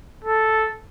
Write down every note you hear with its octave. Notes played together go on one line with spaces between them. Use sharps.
A4